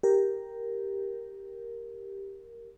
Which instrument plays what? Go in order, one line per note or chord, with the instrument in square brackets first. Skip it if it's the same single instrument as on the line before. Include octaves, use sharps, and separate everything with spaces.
[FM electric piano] G4 A#4